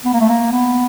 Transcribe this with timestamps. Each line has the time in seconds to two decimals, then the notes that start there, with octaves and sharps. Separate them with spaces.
0.05 B3
0.13 A#3
0.21 A3
0.29 A#3
0.51 B3